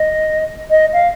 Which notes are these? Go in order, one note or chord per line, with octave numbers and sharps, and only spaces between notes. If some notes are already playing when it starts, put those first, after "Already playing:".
Already playing: D#5
D#5
F5